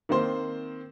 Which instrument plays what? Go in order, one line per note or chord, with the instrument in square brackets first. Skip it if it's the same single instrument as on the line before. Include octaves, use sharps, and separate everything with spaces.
[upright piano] D#3 A#3 C4 C5 C6